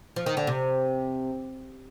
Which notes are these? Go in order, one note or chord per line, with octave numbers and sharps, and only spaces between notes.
F3
D#3
D3
C3